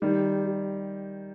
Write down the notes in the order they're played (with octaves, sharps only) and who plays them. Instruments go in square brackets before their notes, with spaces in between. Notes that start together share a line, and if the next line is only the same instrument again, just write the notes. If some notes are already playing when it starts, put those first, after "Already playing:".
[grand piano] D#3 G3 [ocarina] G4